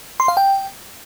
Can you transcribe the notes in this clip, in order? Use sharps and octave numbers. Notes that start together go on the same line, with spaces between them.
C6
F5
G5